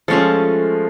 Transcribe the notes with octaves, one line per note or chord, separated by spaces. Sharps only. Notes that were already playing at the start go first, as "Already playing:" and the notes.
F3 G#3 A3 C#4 F4 A4